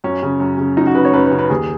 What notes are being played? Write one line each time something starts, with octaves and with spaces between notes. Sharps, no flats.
F#2 C#4
C#3
F#2
C#3
F#2 D#4
F#4
C#3 B4
C#5
F#2 B4
B4
C#3
B4
D#2 G#4